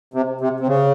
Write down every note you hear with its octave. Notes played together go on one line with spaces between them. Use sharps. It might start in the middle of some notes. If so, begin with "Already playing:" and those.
C3
C3
C3
C#3